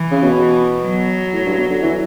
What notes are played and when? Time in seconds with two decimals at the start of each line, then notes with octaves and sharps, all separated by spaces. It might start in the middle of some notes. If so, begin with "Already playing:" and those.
Already playing: E3
0.11 C#3
0.22 B2
0.84 F#3
1.33 A2
1.46 G2
1.58 B2
1.70 D3
1.82 E3